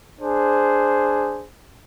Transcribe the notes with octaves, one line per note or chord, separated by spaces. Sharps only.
D4 G#4 C5